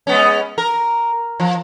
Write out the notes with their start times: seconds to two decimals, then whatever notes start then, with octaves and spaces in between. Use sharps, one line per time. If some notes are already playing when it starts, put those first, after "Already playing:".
0.07 G#3 B3 C#4
0.58 A#4
1.40 F3